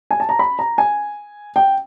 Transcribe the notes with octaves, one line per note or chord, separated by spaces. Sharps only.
G#5
A5
A#5
B5
A#5
G#5
G5